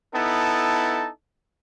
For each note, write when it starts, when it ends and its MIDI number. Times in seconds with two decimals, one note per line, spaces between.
0.14 1.09 59
0.14 1.09 63
0.14 1.09 64
0.14 1.09 69
0.14 1.09 81